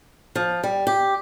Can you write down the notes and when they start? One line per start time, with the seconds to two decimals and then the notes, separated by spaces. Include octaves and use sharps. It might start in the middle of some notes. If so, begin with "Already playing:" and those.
0.35 F3
0.63 G3
0.87 G4